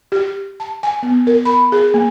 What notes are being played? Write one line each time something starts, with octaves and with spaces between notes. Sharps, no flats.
G4
A5
G#5
B3
A#4
B5
G#4
A#3